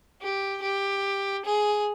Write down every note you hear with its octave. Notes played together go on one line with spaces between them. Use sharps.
G4
G4
G#4